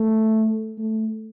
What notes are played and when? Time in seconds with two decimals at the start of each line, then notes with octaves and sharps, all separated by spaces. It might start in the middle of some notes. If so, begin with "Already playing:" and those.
Already playing: A3
0.78 A3